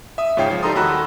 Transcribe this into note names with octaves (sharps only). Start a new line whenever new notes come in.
E5 D#6
G#2 C#3 F4 C#5 G5 C7
F3
G3 D#4 A4 A#5 C6 D#6
D#2 F#4 A4 B5 E6 F#6